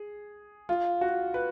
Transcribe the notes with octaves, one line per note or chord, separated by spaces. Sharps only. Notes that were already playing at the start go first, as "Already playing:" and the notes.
Already playing: G#4
F4
F#4
B4